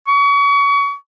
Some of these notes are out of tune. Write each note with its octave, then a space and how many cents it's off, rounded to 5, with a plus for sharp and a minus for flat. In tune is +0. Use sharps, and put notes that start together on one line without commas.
C#6 +35